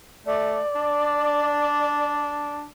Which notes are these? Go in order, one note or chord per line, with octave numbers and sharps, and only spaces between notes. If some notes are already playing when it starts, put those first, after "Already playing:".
A3 D5
D4